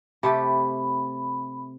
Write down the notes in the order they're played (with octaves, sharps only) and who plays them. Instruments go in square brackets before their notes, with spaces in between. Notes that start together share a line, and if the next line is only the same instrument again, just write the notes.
[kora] C3 A3 G4 [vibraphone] B5